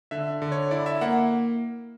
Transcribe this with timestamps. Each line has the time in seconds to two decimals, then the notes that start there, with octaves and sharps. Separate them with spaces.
0.11 D3 E5
0.42 D3
0.52 C#5
0.71 E4 D5
0.86 E5
1.01 A#3 F#5